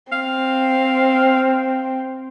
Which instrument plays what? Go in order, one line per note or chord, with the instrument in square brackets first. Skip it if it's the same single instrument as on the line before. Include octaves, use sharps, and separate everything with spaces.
[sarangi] C4 [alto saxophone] F5